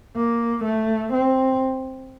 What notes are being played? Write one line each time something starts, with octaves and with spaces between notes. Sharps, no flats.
A#3
A3
C4